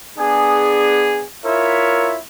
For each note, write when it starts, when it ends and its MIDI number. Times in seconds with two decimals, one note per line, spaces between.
0.18 1.24 59
0.18 1.24 62
0.18 1.24 68
1.44 2.18 64
1.44 2.18 65
1.44 2.18 70
1.44 2.18 73
1.44 2.18 76